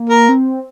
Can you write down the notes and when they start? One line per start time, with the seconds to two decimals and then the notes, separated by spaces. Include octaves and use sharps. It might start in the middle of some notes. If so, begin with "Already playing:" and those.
Already playing: A#3
0.09 A#4
0.29 C4